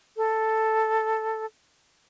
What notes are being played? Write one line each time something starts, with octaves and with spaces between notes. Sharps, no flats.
A4